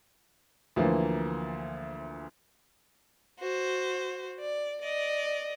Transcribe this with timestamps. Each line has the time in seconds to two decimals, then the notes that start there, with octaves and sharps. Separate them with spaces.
0.76 D2 E3 F3 A#3
3.39 F#4 C5
4.40 D5
4.82 D5 D#5